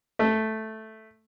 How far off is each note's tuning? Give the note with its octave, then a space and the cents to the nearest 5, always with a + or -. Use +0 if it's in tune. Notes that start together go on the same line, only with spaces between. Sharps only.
A3 -5